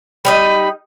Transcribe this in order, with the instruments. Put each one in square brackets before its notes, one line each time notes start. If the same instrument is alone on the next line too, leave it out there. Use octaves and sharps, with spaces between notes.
[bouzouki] G3 D#4 D#5 [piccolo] B5